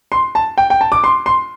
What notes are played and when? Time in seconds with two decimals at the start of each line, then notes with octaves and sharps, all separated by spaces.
0.12 C6
0.35 A5
0.58 G5
0.70 G5
0.81 A5
0.92 D6
1.04 C6
1.26 C6